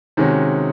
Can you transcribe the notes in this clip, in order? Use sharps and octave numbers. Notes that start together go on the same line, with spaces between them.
C3 D#3 G#3 C#4 F#4